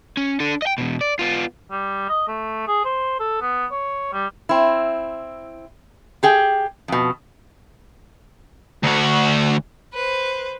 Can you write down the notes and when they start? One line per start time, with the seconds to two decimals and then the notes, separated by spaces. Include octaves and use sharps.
0.17 C#4
0.40 D4 A4
0.62 D#5 G5
0.78 E2 B2
1.01 D5
1.19 B3 F4
1.71 G3
2.09 D#5
2.28 A3
2.68 G#4
2.85 C5
3.20 A4
3.41 B3
3.71 C#5
4.13 G3
4.49 C4 E4
6.23 G4 G#4 G5
6.88 F2 B2
8.84 D2 F#4
9.93 B4 C5